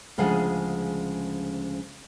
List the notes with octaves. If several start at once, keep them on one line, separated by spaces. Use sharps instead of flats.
D2 C#3 F3 G#3 F#5 G#5